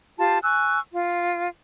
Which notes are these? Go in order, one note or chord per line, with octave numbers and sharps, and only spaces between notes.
F4 G4 A5 C6
G#5 C#6 E6 F#6
F4